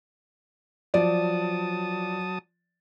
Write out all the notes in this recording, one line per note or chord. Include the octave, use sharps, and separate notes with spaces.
F3 F#3 D5 A5 D#6